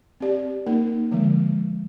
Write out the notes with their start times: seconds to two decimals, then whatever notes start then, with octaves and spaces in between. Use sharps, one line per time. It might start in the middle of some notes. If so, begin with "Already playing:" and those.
0.20 C4 G4 D5
0.66 A#3 D#4 A#4
1.12 D3 F3 G#3